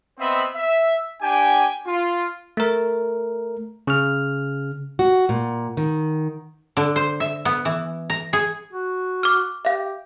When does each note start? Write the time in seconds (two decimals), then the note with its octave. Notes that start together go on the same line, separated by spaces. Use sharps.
0.19 B3 C4 C5 D#5 E5 B5
0.55 E5
1.22 D4 G4 G5 G#5
1.86 F4
2.57 A3 A#4
3.87 C#3 F6
4.99 F#4
5.29 A#2
5.77 D#3
6.77 D3
6.96 C5
7.20 E5
7.45 B3
7.65 E3
8.10 A#5
8.33 G#4
8.73 F#4
9.23 D6 F6
9.65 G4 E5 F5